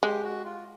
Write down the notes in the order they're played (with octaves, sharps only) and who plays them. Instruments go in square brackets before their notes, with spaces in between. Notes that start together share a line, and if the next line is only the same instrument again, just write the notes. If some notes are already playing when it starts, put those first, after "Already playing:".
[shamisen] G#3 [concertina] G4
[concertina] F#4
F4